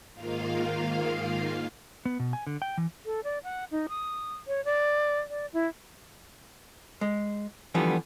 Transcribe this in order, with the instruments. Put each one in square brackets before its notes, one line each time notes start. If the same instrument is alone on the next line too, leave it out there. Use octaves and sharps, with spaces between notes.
[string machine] G#2 D#3 A#3 F4 F5
[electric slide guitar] B3
B2
G#5
D3
G5
E3
[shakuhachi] A4
D5
F#5
D#4
D#6
C#5
D5
D5
E4
[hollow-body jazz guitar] G#3
D3 E3 F3 G3 B3